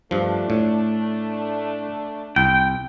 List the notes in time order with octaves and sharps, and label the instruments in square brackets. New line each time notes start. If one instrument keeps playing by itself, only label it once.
[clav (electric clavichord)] G2 F3 [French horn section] A3 D4
[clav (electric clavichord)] A2
[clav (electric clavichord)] C2 [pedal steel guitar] G5